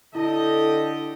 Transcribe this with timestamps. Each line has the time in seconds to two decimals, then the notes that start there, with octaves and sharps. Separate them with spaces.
0.15 D3 E4 G4 A4 D#5